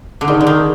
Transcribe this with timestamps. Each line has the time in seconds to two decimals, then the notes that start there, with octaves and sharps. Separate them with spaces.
0.21 D3
0.28 D#3 D#4 G#4 D5
0.41 D3
0.47 D#3